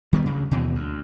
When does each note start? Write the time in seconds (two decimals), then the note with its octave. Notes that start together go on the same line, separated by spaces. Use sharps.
0.13 D#3 G3 B3
0.26 D2 C#3
0.51 D#2 B2 E3
0.75 D2